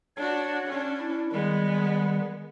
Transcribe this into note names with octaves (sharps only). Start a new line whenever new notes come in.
D4 F#4 C#5
C#4 D4
E4
D#3 G3 G#3 B3